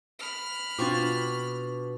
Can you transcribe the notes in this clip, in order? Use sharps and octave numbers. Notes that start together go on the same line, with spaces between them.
B5 F6
B2 C4 D4 F4 C#6 D6